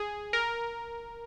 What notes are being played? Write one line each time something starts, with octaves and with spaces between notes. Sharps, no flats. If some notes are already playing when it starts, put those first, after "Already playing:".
Already playing: G#4
A#4